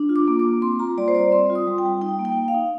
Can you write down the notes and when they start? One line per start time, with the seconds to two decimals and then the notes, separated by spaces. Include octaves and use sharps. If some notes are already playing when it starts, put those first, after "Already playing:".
Already playing: D4
0.09 F4
0.16 D6
0.28 A#3
0.39 D6
0.45 A#3
0.62 C4 C6
0.80 F4 A#5
0.97 G3 D5
1.08 C5
1.14 G3 D5
1.32 C4 C6
1.50 F4
1.55 D#6
1.67 G3
1.78 G5
1.85 G3
2.01 D#4 G5
2.19 A#3
2.25 G5
2.37 A#3
2.48 F5
2.54 D#4